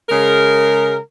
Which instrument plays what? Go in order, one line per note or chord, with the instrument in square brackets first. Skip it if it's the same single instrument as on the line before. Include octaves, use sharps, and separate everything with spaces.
[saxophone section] C#3 G#3 A#4